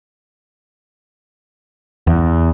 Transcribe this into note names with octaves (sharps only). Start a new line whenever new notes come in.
E2